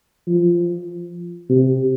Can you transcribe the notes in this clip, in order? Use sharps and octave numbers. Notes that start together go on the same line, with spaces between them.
F3
C3